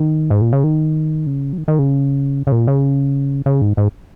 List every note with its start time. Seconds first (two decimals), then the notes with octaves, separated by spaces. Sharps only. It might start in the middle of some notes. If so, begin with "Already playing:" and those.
Already playing: D#3
0.30 G#2
0.41 A#2
0.53 C#3
0.64 D#3
1.27 C#3
1.53 F#3
1.58 D#3
1.68 D#3
1.79 C#3
2.47 C#3
2.52 A#2
2.67 C#3
3.46 C#3
3.61 G#2
3.77 G#2